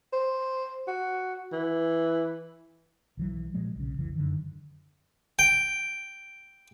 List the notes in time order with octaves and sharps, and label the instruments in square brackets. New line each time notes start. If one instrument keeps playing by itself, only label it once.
[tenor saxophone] C5
F#4
E3
[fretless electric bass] B1 E3 F#3
A#2 F3 F#3 G#3
B1 C#3
F1 B1 C#3 E3
F#2 D3 D#3
[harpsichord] G5